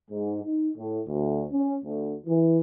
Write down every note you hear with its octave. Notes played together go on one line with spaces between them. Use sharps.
G#2
D#4
A2
D2
C#4
D2
E3